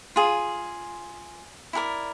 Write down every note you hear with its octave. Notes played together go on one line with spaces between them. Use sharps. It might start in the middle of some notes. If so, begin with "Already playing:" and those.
F4 G#4
E4 G4 A#4 D5